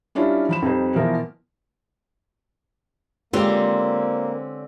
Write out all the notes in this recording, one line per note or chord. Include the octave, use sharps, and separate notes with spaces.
G3 C#4 D4 E4 F4
F3 B5 E7
F2 G3 D#4 B4 C5
B2 E3 F3 A#4
D3 G#3 A#3 C4 C#4 F4 G4 B4